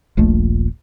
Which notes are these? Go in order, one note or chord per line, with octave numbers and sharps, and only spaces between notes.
D#1 A#1 A#2 A3